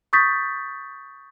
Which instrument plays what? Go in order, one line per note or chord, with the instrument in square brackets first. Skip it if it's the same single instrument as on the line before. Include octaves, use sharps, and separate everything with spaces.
[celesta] C#6 D#6 G6 A6 B6